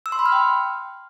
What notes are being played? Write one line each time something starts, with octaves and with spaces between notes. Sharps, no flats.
E6
C6
B5
F6
G5